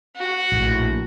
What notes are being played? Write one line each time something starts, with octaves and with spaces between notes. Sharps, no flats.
F#4
A#1 A2